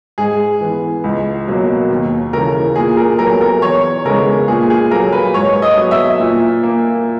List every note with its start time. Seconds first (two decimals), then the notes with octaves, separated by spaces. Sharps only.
0.18 G#2 G#4
0.60 E3 B3
1.04 C#2
1.47 B2 F#3 A#3
1.90 D#2
2.33 C#3 E3 A#4
2.76 A#2 G#4
2.97 A#4
3.19 F#3 B3 A#4
3.41 A#4
3.62 E2 C#5
4.05 C#3 G#3 B3 A#4
4.48 A#2 G#4
4.70 G#4
4.91 F#3 A#3 A#4
5.12 B4
5.34 G#2 C#5
5.62 D#5
5.77 F#3 B3
5.91 E5
6.20 A#2
6.63 A#3